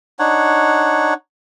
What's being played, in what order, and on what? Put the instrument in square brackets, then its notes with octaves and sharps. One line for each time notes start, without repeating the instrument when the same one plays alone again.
[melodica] D4 D#4 C#5 F#5